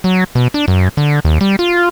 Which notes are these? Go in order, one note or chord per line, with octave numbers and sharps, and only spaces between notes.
F#3
B2
D4
F#2
D3
D#2
G3
F4